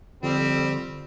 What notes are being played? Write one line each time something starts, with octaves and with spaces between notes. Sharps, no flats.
F2 D3 G3 C4